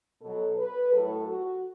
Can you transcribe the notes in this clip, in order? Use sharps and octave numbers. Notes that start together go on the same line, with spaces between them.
B2 F#3 A4
B4
A2 F#3 A4
F#4